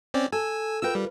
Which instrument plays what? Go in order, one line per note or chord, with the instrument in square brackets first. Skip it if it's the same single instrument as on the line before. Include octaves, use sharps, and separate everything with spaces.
[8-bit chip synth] C4 C#4 D5
[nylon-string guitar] A4 [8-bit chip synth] G#5 E6
[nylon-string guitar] F4 A#4 B4 [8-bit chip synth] G5 E6
[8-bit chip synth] G3